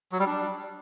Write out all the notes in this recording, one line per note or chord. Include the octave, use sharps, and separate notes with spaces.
F#3
G3
D4